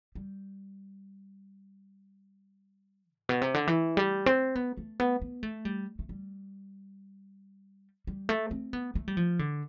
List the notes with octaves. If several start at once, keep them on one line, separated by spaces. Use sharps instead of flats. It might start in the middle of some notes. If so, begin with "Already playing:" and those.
G3
A2
B2
C3
D3
E3
G3
C4
B3
A3
B3
B3
A3
G3
A3
G3
G3
A3
C4
B3
A3
G3
F3
D3